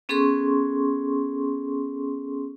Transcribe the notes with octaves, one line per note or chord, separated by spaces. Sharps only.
B3 C#4 G#4 A4 C6 C#6